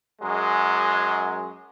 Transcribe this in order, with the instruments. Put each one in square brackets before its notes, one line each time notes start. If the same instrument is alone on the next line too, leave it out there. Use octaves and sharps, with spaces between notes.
[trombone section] F#2 F#3 G#3